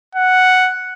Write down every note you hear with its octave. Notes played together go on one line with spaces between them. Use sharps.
F#5